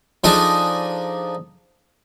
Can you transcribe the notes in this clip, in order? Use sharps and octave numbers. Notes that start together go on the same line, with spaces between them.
F3 D4 D#4 G#4 A4 D#5